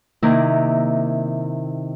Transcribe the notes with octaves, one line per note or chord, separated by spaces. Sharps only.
C3 D#3 A#3 E4